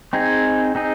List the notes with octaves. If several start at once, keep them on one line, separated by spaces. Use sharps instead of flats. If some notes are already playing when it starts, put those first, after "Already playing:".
C4 D#4 G#4
C4 D#4 G#4